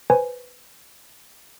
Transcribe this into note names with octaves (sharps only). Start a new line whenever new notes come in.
B4 C5 G#5